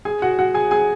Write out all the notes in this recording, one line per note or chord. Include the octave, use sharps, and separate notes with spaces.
G#4 G#5
F#4 F#5
F#4 F#5
G#4 G#5
G#4 G#5